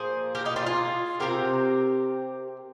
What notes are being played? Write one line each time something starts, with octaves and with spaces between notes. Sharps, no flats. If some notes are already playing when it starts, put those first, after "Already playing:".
Already playing: A#2 F3 A#3 G#4 C5
G4 A#4
D#4 G4
D4 F4
F4 G#4
C3 F3 C4 G4 A#4